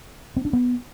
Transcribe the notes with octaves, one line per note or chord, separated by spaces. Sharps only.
C4
D4
B3